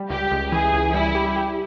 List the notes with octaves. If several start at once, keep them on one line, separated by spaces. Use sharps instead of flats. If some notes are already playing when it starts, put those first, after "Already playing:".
Already playing: G3
C#2 G4
C#2
E3 G#4
C#2
G3 E4
G4
G4